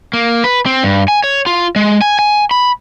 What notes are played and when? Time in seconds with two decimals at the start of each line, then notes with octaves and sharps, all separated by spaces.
0.13 A#3
0.44 B4
0.66 C4
0.83 G2
1.08 G#5
1.24 C#5
1.46 F4
1.76 G#3
2.01 G#5
2.19 G#5
2.51 B5